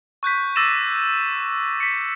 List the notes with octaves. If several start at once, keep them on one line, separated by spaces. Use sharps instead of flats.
C#6 F#6 G6 B6
D6 E6 A6 A#6 D#7 E7
B6 C#7